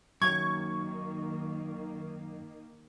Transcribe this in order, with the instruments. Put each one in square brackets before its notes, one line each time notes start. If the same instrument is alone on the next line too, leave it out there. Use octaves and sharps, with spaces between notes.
[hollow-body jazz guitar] F#2 [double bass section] D#3 A#3 [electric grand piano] C#6 [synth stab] G#6